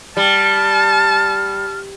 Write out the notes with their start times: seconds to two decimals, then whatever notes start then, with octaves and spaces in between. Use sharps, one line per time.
0.17 G3 A5 F6